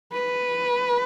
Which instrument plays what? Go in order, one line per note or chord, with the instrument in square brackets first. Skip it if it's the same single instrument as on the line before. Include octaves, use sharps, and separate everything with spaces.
[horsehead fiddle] B4